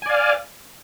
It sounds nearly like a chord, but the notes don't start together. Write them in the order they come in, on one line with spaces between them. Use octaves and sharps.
G#5 D5 F5